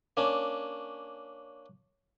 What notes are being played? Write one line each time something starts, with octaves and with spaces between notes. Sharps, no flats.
A#3 C#4 D4